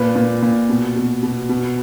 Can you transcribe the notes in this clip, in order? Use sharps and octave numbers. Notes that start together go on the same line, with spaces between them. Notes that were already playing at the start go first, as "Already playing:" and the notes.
Already playing: A#2 B4
A#2
A#2
B2
B2
B2
B2